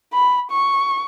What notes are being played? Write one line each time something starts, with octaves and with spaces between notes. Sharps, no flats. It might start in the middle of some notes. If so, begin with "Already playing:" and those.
B5
C#6